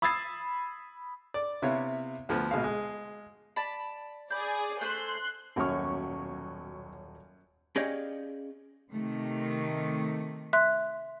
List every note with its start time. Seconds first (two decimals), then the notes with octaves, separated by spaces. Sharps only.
0.02 B5 D#6 E6 G#6 A6 C7
1.34 D5
1.62 C3 B3 E4 C#5 F5
2.29 D2 F3 B3
2.51 A#1 B2 G#3 F5
2.64 G#3
3.56 D5 A5 B5
4.30 G#4 D5 B5 G6
4.81 A3 C5 G#5 C6 F#6
5.56 D#1 B1 F#2 C#4 F#4 C#5 C#6 F6
7.76 C#4 G4 G#4 D5 D#5 F5
8.90 C3 D#3 A3
10.53 E5 C6 F#6